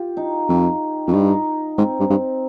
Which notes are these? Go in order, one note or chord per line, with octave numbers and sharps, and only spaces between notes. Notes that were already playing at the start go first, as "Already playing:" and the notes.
Already playing: F4 G4
D#4
F2
F2
G2 D#4
G#2 C4
G2
G2